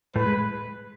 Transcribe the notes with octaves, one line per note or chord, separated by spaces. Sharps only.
A2 A3 B4
G#3